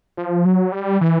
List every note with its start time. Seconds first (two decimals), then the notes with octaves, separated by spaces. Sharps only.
0.17 F3
0.45 F#3
0.72 G3
1.01 E3